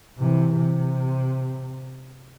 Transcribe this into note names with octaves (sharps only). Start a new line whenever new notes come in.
C3 E3
C3